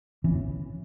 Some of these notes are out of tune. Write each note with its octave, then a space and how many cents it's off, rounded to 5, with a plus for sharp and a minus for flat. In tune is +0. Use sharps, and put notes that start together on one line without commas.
E3 +0 C#4 +0